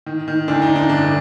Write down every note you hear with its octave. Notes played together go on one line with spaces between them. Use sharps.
D#3
D#3
D2 D4
D#4
D2
D4
G1 D4